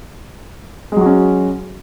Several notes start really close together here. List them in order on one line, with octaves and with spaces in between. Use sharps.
G#3 F#3 F#4 C#4